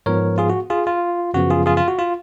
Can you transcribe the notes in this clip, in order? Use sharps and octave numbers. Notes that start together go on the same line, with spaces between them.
G#2 F3 B3 A#4 C#5
F4 G#4
F#4
F4 G#4
F4
F#2 C#3 F3 B3 F#4
F4 G#4
F4 G#4
F4
F#4
F4